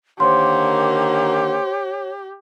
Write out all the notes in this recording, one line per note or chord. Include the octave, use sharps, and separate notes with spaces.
D3 D#3 A#3 G4 C5 C#5 C6